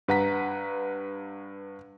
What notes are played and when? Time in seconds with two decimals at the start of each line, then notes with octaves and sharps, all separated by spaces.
0.08 G2 B4 F#5 A#5 B6